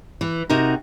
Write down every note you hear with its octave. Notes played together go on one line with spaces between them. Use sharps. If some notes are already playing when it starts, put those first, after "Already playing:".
E3
C3 D#4 F#4 A#4